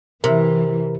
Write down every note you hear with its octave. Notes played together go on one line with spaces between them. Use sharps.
C3 E3 A#4